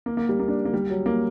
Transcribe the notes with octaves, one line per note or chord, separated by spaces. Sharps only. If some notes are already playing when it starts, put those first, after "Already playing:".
A#3
A#3
G3
A#3
D4
A#3
G3
F#3
A#3